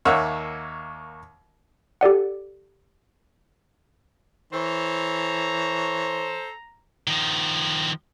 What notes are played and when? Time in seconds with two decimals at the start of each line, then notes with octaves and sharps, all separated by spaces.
0.05 D#2 A#3 C#5 E5 F#5
2.01 G4 A4 D5 F#5
4.53 E3 A4 C5 C#5 A#5
7.08 D#3 F3